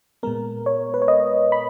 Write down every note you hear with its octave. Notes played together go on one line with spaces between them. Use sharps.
A#2 G#3 B3 A#4
C#5
B4
C#5
D#5
B5